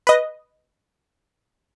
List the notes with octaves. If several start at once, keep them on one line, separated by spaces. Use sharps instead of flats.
B4 D#5